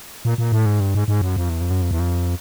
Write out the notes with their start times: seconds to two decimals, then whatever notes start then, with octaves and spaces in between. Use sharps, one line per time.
0.25 A#2
0.38 A#2
0.52 A2
0.66 G#2
0.80 G2
0.95 G#2
1.08 G#2
1.22 F#2
1.36 F2
1.49 E2
1.61 F2
1.70 F#2
1.82 F2
1.91 E2
2.00 F2